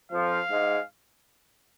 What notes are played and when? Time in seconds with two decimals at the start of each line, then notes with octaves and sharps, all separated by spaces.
0.11 F2 F3 F5
0.50 G#2 G#3